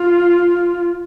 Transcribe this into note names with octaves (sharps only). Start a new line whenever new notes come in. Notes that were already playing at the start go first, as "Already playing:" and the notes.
Already playing: F4